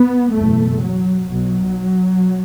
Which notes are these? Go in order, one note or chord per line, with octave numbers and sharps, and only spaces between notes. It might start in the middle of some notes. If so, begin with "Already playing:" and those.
Already playing: B3
F#1 E2 B2 A3
F#3
B1 B2 F#3